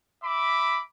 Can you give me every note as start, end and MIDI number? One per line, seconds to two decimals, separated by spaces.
0.23 0.80 76
0.23 0.80 83
0.23 0.80 86